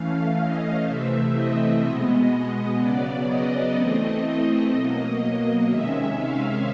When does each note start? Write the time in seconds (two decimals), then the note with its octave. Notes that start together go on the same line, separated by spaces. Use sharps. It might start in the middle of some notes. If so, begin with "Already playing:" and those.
Already playing: E3 A3 C#4 F5
0.38 D#5
0.86 C3 E3 A3 C4 E5
1.34 D#5
1.82 B2 G#3 B3
2.79 C#3 F#3 B3 D5
3.27 D#5
3.76 E3 A3 C4
4.72 B2 F#3 A#3 D#5
5.68 C3 D#3 G#3 C#4 E5
6.17 F5